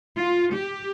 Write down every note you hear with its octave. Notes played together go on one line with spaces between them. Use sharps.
F4
G4